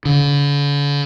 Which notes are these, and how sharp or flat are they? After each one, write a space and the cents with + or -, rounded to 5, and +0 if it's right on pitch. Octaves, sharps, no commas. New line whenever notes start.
D3 -45